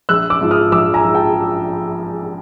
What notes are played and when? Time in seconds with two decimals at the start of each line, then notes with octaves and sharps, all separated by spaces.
0.09 A#1 E6 F#6
0.30 D6 E6
0.41 G#2 F3
0.51 D#6 F6
0.72 A#1 D6 E6
0.94 G#5 A#5
1.04 G#2 F3
1.15 G5 A5